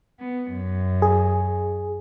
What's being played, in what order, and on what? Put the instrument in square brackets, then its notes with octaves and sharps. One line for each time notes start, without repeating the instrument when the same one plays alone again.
[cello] B3
F#2
[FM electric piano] G#4